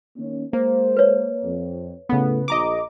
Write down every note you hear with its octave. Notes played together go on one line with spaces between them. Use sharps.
D#3 A#3 C#4
G#3 A#3 C5
B4 C#5
F2
A2 C#3 A3 B3
A#1 D#5 A#5 D6